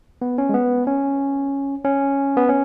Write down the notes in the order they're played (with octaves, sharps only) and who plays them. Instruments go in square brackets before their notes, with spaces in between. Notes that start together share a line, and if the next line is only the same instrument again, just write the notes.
[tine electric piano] B3
C#4
G#3
B3
C#4
C#4
B3
C#4